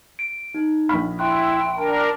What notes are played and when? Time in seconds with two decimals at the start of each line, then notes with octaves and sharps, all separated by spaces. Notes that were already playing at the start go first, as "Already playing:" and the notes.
0.19 D7
0.54 D#4
0.89 A#1 B5 F6
1.19 E4 E5 G5 C6 F#6
1.78 D4 A#4 A5